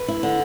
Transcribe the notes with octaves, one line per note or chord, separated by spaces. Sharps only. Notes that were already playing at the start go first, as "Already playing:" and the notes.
Already playing: B4
E4
D3